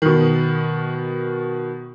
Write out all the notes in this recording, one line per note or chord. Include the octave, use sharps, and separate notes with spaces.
B2 D#3